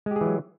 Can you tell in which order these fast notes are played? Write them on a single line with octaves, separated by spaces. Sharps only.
G#3 G4 G#4 E3 F#3